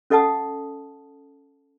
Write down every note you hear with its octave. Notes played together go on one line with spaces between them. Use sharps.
C#4 A4 D#5 F#5 A5 D#6